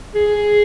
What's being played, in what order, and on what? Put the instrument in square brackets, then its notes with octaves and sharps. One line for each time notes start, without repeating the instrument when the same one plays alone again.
[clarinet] G#4